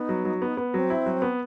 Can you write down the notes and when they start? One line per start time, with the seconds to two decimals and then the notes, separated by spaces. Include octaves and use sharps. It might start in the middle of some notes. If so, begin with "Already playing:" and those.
Already playing: B3 D#4
0.09 F#3
0.25 F#3
0.42 B3
0.57 B3
0.74 F#3 C4
0.90 E4
1.06 F#3
1.22 B3